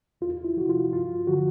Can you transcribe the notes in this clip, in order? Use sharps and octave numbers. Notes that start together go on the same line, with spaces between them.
E2 F4
E4
C3 F3 F#4
F4
G2 F4
D3 F3 F#4